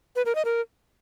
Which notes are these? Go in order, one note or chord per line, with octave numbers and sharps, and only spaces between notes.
B4
A#4
D#5
A#4